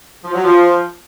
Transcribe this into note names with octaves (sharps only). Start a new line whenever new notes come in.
F3
F#3
F3